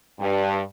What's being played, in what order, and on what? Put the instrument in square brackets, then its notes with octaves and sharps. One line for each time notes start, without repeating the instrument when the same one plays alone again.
[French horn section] G2